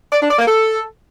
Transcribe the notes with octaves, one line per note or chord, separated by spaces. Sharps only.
D5
D4
D5
A#3
A4